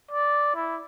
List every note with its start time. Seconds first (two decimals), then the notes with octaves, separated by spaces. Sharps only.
0.11 D5
0.55 E4